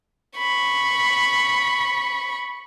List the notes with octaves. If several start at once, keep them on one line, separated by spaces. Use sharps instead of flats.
B5 C#6